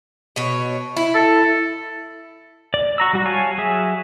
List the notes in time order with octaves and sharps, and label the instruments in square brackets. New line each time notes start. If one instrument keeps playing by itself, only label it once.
[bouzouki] B2 C#5
E4
[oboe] A4
[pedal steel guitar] D5
F#4 A#5 E6
G3 F#4
C#5 F5 G#5 A5
F#3 G#4 E5